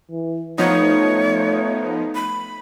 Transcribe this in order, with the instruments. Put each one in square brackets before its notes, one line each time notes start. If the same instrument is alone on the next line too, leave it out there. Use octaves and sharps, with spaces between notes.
[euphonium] E3
[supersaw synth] F3 B3 D#4 [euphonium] A3 [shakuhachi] C#5
[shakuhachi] B5